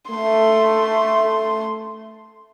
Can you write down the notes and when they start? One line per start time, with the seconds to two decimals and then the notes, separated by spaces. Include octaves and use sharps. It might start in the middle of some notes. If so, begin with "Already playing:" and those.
0.11 A3 C6